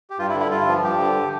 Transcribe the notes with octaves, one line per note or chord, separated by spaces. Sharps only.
G4
G2 F4
E4
D3
E4
G2 F4
F3
G2 G4
D3